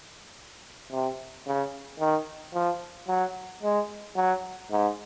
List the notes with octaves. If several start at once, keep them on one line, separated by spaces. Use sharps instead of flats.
C3
C#3
D#3
F3
F#3
G#3
F#3
G#2